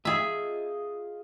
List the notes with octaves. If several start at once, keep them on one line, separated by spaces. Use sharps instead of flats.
F4 G#4 D#5 E5